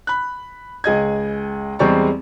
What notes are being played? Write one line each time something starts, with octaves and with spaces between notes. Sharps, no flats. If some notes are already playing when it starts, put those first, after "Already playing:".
B5 F#6
C#2 G#4 D#5 G#6
E2 G3 G#3 C4 D5 C#6